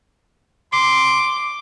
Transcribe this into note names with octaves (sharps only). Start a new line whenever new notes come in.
C6 D6